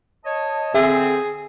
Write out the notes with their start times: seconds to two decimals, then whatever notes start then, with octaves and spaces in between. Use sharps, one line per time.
0.25 C#5 D#5 A5
0.75 D3 C4 G#4 E5